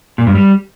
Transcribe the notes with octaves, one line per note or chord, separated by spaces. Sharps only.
A#2
G2
G3